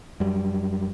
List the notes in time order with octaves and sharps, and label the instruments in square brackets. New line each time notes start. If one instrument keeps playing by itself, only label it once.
[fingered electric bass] F#2 G3